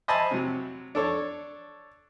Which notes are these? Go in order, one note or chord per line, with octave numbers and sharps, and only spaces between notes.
C5 D#5 E5 G#5 A5 B5
C3 F#3
D4 A4 C#5